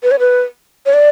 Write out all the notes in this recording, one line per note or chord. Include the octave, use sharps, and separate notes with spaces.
B4
C#5
B4
C#5
D5